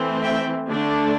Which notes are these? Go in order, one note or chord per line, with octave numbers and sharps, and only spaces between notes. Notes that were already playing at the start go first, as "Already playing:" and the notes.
Already playing: E3 A3 C4
E5 G5
D3 A3 D4